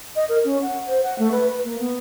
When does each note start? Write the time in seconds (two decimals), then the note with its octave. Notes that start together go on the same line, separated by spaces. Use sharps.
0.16 D#5
0.29 A#4
0.44 C#4
0.62 F#5
0.88 C5
1.03 F#5
1.19 A3
1.32 B4
1.48 B4
1.64 A#3
1.79 B3